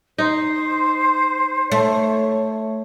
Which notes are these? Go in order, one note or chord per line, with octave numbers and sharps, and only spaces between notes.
D#4 C5
A3 C#5